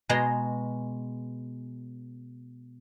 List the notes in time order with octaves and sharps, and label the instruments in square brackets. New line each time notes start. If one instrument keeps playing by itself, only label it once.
[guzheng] B2 G#3 A#5 C6